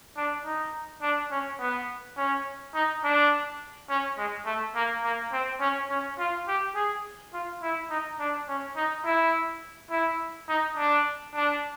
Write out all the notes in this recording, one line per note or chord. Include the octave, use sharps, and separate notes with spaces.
D4
D#4
D4
C#4
B3
C#4
D#4
D4
C#4
G#3
A3
A#3
A#3
C4
C#4
C#4
F4
G4
G#4
F4
E4
D#4
D4
C#4
D#4
E4
E4
D#4
D4
D4